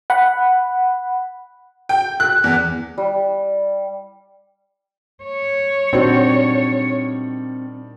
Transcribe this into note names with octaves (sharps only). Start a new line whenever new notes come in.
F#5 B5
G5
F#6
E2
G3
C#5
A#2 D#3 G3 C4 D4 F#4 C5